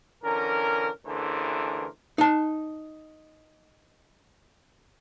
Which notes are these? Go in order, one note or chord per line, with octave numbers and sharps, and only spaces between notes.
D3 E3 C#4 A#4
A1 D3 E3 G#4 A#4 C5
D#4 A5